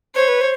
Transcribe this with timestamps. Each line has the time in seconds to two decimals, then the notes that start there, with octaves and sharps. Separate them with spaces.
0.15 C5 C#5
0.28 B4
0.41 C5